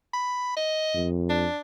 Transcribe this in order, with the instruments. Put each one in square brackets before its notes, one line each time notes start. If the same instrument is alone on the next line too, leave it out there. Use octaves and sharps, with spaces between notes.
[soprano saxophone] B5
D#5
[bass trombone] F2
[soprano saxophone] D4